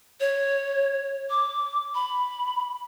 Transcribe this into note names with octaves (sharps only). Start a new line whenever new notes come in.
C#5
D6
B5